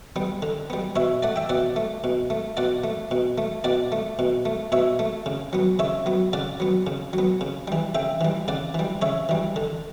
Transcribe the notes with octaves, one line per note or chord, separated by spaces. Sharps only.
G3 B3
D3
G3 B3
B2 C#5 E5
A3 D5 F#5
E5 G5
B2 D5 F#5
A3
B2
A3
B2 D5 F#5
A3
B2
A3
B2 D5 F#5
A3
B2
A3
B2 C#5 E5
A3
C#3
F#3 B3
C#3 C#5 E5
F#3 B3
C#3 D5 F#5
F#3 B3
C#3
F#3 B3
C#3
E3 G3
C#3 E5 G5
E3 G3
C#3 D5 F#5
E3 G3
C#3 C#5 E5
E3 G3
D3